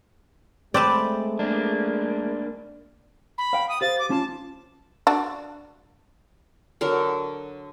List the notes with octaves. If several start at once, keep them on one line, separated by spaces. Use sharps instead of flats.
G#3 A3 C4 B4 D5 A5
A#3 D4
B5
F5 G5
D#6
G4 C5 F5 A6
D6
C#4 F4 A5
D4 F#4
D3 F#3 A#4 A5